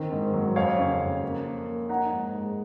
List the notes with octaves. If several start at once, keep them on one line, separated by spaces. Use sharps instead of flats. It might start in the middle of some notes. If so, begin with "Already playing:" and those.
Already playing: D#3 C4
G#2
F#3
F2 C#5 F5
C#3
F2
A#3
A#3
A#3
D#4 F#5 A#5
G#2
G#3